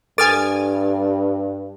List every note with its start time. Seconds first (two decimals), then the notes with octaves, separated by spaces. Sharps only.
0.18 G2 A4 G#5 F6 A6